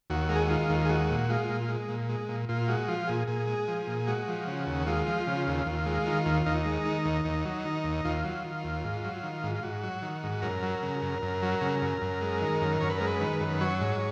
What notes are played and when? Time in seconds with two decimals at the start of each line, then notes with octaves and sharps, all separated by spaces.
0.10 D#2 F#4
0.29 G#3 A#4
0.36 G#4
0.42 F#4
0.50 D#3 F4
0.69 D#2
0.85 G#4
0.89 G#3 F#4
1.10 A#2
1.30 G#3 F4
1.49 A#2
1.69 G#3
1.89 A#2
2.09 G#3
2.29 A#2
2.49 A#2 F4
2.68 G#3 F#4
2.88 F3 F4
3.08 A#2 G#4
3.27 A#2 G#4
3.47 G#3
3.68 F3
3.87 A#2
4.07 G#3 F#4
4.28 F3
4.47 C#3
4.67 D#2
4.87 G#3 F4
5.07 F3
5.27 C#3
5.47 D#2
5.66 D#2
5.86 G#3
6.06 D#3
6.26 D#2
6.46 D#2 D#4
6.65 G#3
6.85 D#3
7.05 D#2
7.25 D#2
7.45 F#3
7.65 D#3
7.84 D#2
8.05 D#2 F4
8.24 F#3
8.44 D#3
8.64 D#2
8.84 G#2
9.04 F#3
9.23 D#3
9.43 G#2
9.55 F4
9.63 G#2 F#4
9.84 F#3
10.02 D#3
10.23 G#2
10.42 F#2 A#4
10.63 F#3
10.82 C#3
11.02 F#2
11.22 F#2
11.43 F#3
11.61 C#3
11.82 F#2
12.02 F#2
12.21 G#3
12.41 D#3
12.61 F#2
12.80 F#2 C#5
12.89 B4
12.98 G#3 A#4
13.07 B4
13.20 D#3
13.40 F#2
13.61 F#3 C#5
13.80 G#2